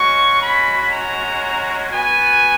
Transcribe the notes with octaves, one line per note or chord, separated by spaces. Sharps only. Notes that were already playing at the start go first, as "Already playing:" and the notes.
Already playing: G#3 C#4 F#4 C#6
B5
A#5
B3 F#4 G#5